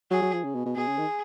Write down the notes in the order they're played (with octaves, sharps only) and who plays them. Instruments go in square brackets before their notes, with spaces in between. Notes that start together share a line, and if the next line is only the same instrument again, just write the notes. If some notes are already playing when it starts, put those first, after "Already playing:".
[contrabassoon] F#3 [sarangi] G#4
[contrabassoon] F#3
F3
C#3
B2
B2
[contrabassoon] B2 [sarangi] G#4
[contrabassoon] C#3
D#3